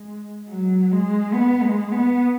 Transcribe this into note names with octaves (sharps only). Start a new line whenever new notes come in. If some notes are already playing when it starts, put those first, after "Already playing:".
Already playing: G#3
F#3
G#3
B3
G#3
B3